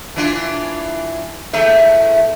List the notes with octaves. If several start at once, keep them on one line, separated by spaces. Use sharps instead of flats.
E3 D4 F4
E2 A3 E5